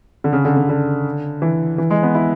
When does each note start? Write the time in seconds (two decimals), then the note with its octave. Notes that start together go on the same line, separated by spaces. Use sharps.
0.24 D3
0.33 C#3
0.45 D3
0.57 D3
0.69 D3
1.42 E3
1.78 E3
1.91 G#3
2.03 B3
2.15 E4